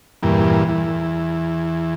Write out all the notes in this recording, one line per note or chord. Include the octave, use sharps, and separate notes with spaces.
E2 G2 A#2
E2